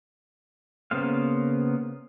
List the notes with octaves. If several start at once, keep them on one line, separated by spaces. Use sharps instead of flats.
C#3 A#3 B3 C5 F5